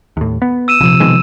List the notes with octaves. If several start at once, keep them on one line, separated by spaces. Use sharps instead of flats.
D#2 A2
B3
E6 D#7 E7
A#1 C3 F3
B2 D#3 G#3